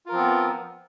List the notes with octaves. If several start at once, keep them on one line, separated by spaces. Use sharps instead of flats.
F3 B3 C4 F4 A#4